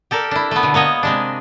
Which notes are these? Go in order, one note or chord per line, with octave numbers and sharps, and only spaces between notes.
G4 A4 A#4 D5
D4 E4
A3 B3
B2 D3
A#3 B3 C#5 D#5
C3 G#3 D4